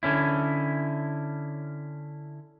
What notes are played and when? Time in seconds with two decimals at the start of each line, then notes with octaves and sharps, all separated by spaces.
0.03 D3 C#4 E4